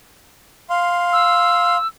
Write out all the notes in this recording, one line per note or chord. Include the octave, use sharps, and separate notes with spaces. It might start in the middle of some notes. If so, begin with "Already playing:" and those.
F5 C6
E6